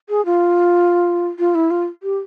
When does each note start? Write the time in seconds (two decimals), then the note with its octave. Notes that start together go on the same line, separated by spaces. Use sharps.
0.09 G#4
0.25 F4
1.39 F4
1.55 E4
1.71 F4
2.03 G4